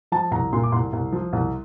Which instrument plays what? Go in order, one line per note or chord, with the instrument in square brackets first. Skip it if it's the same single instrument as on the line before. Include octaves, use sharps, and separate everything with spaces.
[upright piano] F3 A5
C2 A#5
A#2 C6
D6
C2 C6
C2
F3
C2